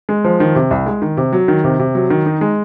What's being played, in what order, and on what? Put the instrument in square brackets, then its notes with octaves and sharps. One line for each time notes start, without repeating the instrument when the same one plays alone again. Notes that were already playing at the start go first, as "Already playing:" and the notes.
[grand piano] G#3
F3
D#3
C3
C2
G#3
D#3
C3
F#3
D#3
C3
C3
F#3
D#3
D#4
G#3